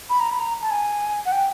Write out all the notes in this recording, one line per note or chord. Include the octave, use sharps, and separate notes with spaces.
B5
A#5
B5
A#5
A5
G#5
F#5
G5